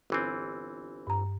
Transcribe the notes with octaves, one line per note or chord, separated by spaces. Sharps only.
G1 E3 C4
G2 A#5